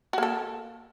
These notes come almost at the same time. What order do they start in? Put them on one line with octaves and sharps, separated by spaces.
F#4 A#3 A4